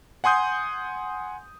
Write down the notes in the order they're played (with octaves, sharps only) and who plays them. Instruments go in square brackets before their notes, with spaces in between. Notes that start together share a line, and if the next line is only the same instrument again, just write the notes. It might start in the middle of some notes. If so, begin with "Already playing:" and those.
[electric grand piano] F#5 G#5 C6 D#6 G6